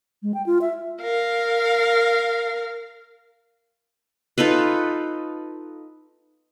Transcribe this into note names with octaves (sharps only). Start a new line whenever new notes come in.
G#3
G5
F4
E5
A#4 F5
D#4 F4 A4 B4